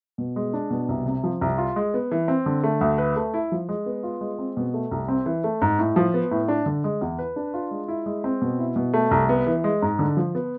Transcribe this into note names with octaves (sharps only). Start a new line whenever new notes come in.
B2
G#3
D4
B2
C2
C3
F3
C2
F4
G#3
B3
E3
C4
D3
A3
D2
B4
A3
E4
F3
G#3
B3
F4
G#3
C4
B2
A3
C2
C4
E3
A3
G#2
A2
F3
B3
A2
D4
D3
G#3
E2
B4
D4
F4
G#3
E4
G#3
C4
B2
E4
B2
A3
C2
B3
E3
G#3
G#2
D3
F3
B3